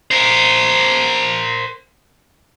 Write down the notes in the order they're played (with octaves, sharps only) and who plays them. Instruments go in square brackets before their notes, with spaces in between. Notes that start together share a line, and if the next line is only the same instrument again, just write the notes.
[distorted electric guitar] A#4 C5